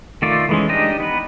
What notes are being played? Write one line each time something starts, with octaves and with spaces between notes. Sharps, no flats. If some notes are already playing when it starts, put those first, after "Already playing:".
D#3 A3 F4 D5
E3 G#3 C#4
D4 D#4 G4 D#5
B3 B4